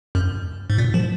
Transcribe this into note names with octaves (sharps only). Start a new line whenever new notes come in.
F#2
G#2
A#2
F3